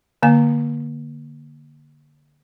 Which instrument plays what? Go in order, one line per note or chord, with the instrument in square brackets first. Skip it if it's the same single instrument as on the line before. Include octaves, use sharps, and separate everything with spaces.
[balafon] D3 A#3 G#5